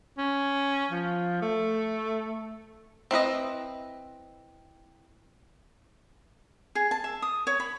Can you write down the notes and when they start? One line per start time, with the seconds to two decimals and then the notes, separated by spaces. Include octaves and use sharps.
0.18 C#4
0.91 F3
1.42 A3
3.11 C4 E4 B4 D#5
6.75 G#4
6.91 A5
7.04 E5
7.22 D#6
7.47 C#5
7.60 B5